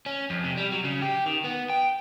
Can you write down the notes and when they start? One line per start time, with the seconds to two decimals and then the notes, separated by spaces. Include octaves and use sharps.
0.06 C#4
0.30 F2
0.44 C3
0.57 G3
0.72 F#3
0.85 C#3
1.02 G4
1.26 D#3
1.44 B3
1.70 G5